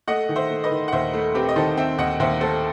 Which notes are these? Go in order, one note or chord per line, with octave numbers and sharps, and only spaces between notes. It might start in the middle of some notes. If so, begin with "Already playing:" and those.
A3 D#5 F#5
D#3
C5 E5
A3
B4 D#5
D#3
F#5
D#2 C5 E5
A3
C4 G4 B4
D#5
D#3 A4 C5
C4 E5 G5
D#2 D#5 F#5
D#2 C5 E5
A3 A4 C5